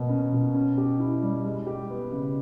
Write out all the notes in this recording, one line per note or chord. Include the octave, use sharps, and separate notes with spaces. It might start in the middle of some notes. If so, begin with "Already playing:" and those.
Already playing: B2 A#3
C#4
B2
C#4
G4
E4
G3
G#3
G4
B3
C#3